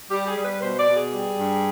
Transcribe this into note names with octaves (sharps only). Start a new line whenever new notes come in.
G3 G4
G#4
G3
B4
B2 C5
D5
B2
G#4
G3
G2